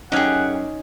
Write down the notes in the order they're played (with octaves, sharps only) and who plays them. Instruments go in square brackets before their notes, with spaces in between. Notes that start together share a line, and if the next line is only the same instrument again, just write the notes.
[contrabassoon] F#2 [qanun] C#4 D#4 [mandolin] G4 G#4 [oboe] F#5